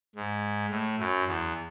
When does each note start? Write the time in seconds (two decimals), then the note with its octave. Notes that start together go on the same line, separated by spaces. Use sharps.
0.15 G#2
0.71 A2
0.99 F#2
1.27 E2